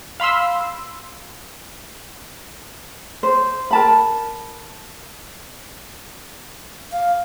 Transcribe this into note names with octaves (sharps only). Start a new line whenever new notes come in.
F5 B5 C6 E6
C5
A#4 A5 B5
F5